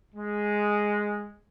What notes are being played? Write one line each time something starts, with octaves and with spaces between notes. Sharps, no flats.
G#3